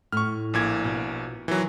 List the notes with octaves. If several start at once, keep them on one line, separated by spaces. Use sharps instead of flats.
A2 C#6 F6
A#1 A#2 G#6
B2
D#3 E3 F#3